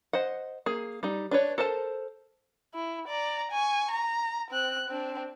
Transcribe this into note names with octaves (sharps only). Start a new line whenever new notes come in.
C5 D#5 F#5
A#3 G#4
G3 D#4
D4 B4 C#5
A4 A#4 C5 A5
E4
D5 A#5
G#5 C#6
A#5
C4 F#6
C4 D4